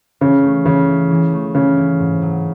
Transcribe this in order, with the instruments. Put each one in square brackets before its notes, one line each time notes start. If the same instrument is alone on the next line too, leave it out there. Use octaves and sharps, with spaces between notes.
[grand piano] C#3 [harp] E3
[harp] A3
[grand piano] C#3 [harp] E3
[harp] E4
E3
A3
[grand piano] C#3 [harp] E3
[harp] E4
G#2
F#3